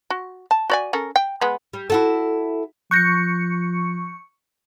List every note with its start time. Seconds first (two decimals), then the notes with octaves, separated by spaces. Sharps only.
0.10 F#4
0.51 A5
0.70 F#4 D5 G#5
0.93 C#4 A4 A#4
1.16 G5
1.41 G#3 B3
1.73 G3
1.90 E4 F#4 A4
2.91 F3 C#6 F#6 G6 A#6 C#7